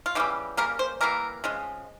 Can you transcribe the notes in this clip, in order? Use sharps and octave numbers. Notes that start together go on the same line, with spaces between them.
F4
C#3 E3 G3 G4
C#3 G3 A#3 A#4
C5
E3 G3 A#3 A#4
C#3 F3 G#3